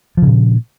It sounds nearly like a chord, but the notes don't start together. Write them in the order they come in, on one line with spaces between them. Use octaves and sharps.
F3 C#3 A#2